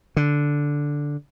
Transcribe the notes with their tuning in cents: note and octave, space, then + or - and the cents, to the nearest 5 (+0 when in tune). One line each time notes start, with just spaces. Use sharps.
D3 -5